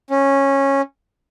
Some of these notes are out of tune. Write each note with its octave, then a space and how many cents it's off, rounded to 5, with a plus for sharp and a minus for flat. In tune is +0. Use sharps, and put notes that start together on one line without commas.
C#4 -15